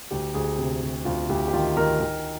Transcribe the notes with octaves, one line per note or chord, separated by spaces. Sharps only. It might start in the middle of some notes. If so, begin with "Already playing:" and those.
D2 G4
D2 G#4
C3
C3
D2 F4
D2 G4
G4
D#3 F4
D#3 A#4
D#3 A#4